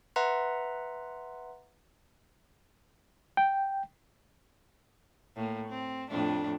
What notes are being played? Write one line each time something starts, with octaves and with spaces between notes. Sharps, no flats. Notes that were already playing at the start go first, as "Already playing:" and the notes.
B4 E5 F#5 A#5 C6
G5
A2 A#3
C4
F2 A2 D4